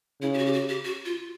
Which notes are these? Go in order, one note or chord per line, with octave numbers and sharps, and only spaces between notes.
C#3 E4
G4
F#4
G4
F#4
G4
F#4
F4